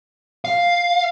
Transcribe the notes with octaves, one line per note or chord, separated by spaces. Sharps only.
F5